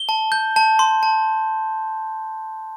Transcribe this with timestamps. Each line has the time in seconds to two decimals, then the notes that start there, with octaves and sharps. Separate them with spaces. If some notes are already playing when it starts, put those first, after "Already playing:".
Already playing: G7
0.09 A5
0.32 G6
0.56 A5
0.79 C6
1.03 A5